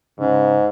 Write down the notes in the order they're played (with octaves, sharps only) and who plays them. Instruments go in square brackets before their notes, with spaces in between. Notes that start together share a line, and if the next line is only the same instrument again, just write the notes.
[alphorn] G#2 [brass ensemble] C#3